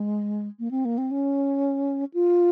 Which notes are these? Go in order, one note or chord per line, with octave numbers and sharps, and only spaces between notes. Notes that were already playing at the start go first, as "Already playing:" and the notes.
Already playing: G#3
A#3
C4
A#3
C4
C#4
F4